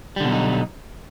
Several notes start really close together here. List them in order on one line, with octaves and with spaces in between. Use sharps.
G3 D3 B2 F#3 D#4